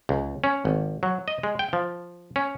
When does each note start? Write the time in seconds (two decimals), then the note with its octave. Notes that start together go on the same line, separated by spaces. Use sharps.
0.09 C#2
0.44 C#4
0.65 G#1
1.03 F#3
1.28 D#5
1.43 G#3
1.59 G5
1.73 F3
2.36 C#4